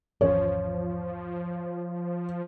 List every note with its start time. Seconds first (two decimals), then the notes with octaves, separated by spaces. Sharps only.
0.21 G#1 E2 F3 C#4 C#5